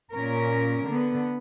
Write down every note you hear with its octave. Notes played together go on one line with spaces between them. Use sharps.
A#2 C#4 A#4
D3 B3